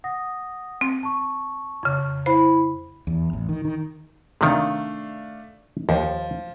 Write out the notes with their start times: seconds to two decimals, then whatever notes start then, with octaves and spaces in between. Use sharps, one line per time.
0.04 F#5 D#6 A#6
0.81 C4
1.03 A5 C#6
1.83 F2 C#3
2.26 E4 C5 B5
3.07 E2
3.33 A1
3.49 D#3
3.65 D#3
4.41 C3 D#3 A3 D4 F5
5.89 D#2 F3